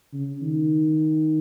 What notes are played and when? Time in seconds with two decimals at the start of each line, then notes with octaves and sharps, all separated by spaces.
0.13 C#3
0.42 D#3